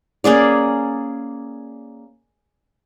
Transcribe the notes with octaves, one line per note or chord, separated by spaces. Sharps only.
A#3 C#4 G#4 D5